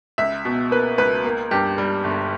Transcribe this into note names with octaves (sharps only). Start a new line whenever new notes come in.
C#2 E5
B2
A#3 B4
C#2 B4
A#3
G2 G4
G3
G1